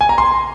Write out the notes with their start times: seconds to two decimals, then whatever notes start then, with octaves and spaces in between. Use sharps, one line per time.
0.01 G#5
0.09 A#5
0.18 C6